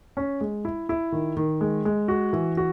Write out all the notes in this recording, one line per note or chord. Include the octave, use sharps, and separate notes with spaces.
C#4
G#3
E4
E4
D#3
D#3
G#3
G#3
F#4
E3
F#4